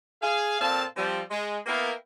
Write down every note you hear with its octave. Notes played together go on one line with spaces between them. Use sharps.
G#4 F5
A#2 C4 A4 F5 A5
F3 G3 C4
G#3
A#3 B3 E4 A#4 F5 G5